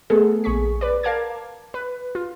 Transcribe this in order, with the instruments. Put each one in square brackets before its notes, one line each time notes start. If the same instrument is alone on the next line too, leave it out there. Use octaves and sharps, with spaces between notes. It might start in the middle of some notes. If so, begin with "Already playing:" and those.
[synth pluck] A3 B3 G#4 A4
A#1 G#4 C#6 B6
B4 D5
A#4 F5 A5 D6 G#6
B4
F4